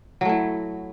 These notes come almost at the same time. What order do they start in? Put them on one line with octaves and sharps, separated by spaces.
F#3 A3 E4